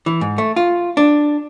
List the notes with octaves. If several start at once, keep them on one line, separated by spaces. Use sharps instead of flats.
E3
G#2
A3
F4
D4